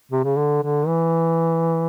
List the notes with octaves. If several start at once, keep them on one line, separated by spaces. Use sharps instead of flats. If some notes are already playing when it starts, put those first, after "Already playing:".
C3
C#3
D3
D3
E3